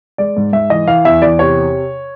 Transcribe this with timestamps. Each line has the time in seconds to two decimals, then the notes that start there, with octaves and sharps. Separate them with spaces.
0.18 G#3 D5
0.37 G#2
0.53 G#2 E5
0.70 E3 D#5
0.87 E3 F5
1.05 E2 E5
1.22 E2 D5
1.39 C3 C#5